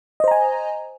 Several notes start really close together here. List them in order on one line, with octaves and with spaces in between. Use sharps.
D#5 C5 A#5 G#5